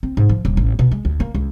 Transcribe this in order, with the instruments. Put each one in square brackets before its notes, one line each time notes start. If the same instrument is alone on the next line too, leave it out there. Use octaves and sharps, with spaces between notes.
[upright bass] C4
G#2
F3
D#1
A1
B2
G#3
D2
A#3
C#2